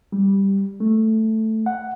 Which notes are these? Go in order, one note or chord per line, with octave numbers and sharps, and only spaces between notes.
G3
A3
F#5